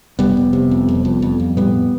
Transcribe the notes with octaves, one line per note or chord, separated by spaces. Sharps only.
F1 G3 B3
F1
C3
F2
F1
F2
F2
F2
A2 G3 B3